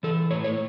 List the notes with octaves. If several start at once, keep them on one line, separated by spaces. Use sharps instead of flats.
E3 A4
A2 C#5
C#5